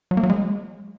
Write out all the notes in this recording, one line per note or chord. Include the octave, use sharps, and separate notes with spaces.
F#3
A#3
F#3
G#3